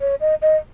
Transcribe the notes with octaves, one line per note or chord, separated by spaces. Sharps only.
C#5
D#5
D#5